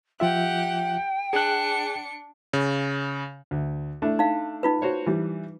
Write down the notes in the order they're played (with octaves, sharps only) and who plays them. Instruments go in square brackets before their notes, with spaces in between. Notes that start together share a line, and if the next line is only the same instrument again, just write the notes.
[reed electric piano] F3 F4 E5 [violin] G4 F#5 [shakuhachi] G5
[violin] D4 C#7 [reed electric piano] G#4 F#6
[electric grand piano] C#3
[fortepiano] D2
A3 D4 E4
[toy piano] D#4 F5
D#4 F4 B4
[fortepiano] F#4 C5 C#5
E3 G3